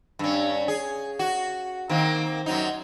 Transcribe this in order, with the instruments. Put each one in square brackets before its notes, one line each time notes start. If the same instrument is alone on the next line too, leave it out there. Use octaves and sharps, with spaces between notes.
[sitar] G2 C#4
G#4
F#4
D#3 A#3 C4
F#2 F#3 D#4